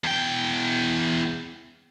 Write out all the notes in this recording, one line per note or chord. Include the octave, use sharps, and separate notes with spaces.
E2 G5